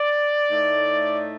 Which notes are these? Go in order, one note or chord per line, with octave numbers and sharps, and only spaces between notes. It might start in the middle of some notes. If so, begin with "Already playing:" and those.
Already playing: D5
A2 A3 D#4